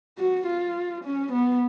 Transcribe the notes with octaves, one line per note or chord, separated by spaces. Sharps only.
F#4
F4
C#4
B3